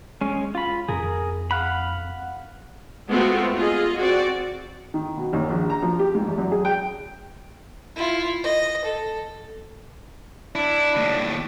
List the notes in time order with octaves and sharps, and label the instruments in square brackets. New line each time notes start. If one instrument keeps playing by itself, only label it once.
[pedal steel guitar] G#3 C#4
F4 B5
[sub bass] F2 [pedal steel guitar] G#4 A#4
[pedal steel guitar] F5 F#5 B5
[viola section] G#3 A3 B3 C4 F4 F#4
F4 G#4 D#5
C4 F#4 D5
[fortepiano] D#3
B2
D#2
A#1
A#5
F3
G4
G#2
E2
F#2
G#4
G5
[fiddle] E4 F4
D#5
A4
[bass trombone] D4 [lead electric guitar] E4
[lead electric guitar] D#2 A2